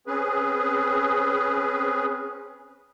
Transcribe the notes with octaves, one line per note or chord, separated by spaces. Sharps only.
C4 C#4 G#4 B4